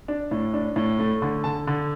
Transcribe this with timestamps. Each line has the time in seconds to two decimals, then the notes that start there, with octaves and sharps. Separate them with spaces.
0.08 D4
0.31 A2
0.54 D4
0.76 A2
0.99 A3
1.22 D3
1.44 D3 A5
1.67 D3